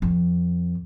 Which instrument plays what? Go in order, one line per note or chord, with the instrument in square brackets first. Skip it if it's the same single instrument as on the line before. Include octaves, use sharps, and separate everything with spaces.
[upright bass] F2